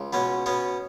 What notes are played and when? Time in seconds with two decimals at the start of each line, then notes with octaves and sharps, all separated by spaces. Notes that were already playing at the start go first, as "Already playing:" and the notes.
Already playing: C#2
0.13 B2 B3 C#4
0.46 B2 B3 C#4